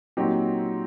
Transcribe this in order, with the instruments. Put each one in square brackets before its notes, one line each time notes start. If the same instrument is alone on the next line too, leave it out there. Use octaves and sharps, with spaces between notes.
[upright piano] A#2 F#3 C4 D#4 G4